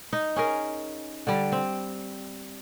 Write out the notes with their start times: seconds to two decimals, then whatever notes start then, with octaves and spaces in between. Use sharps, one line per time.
0.13 D#4
0.36 C#4 G#4 A#4
1.27 D3 G3
1.52 C4